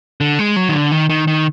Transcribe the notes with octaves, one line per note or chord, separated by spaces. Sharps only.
D3
G#3
F#3
D#3
D3
D#3
D#3
D#3